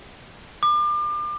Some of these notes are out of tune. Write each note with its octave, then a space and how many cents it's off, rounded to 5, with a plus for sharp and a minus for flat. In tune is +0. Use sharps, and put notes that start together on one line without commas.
D6 +35